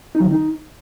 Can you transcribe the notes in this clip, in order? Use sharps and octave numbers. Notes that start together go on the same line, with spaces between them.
D#4
F#3
D#3
D#4